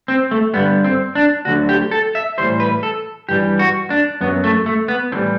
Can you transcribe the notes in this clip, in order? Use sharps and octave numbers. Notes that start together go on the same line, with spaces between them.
C4
A3
G2 D3 G3 B3
C4
D4
D2 D3 F#3 F#4
G4
A4
E5
A2 E3 G3 C5
B4
A4
G2 E3 G3 G4
F#4
D4
F#2 F#3 B3
A3
A3
B3
A2 E3 G3 C4